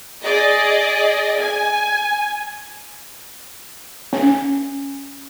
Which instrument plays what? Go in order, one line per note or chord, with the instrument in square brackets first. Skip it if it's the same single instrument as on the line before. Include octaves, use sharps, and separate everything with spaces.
[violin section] G#4 D5 D#5
G#5
[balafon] C#4